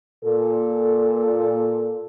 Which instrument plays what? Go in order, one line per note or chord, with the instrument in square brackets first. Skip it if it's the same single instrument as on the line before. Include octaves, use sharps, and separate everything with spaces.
[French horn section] A#2 A4